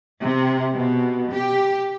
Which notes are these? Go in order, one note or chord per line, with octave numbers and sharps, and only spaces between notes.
C3
B2
G4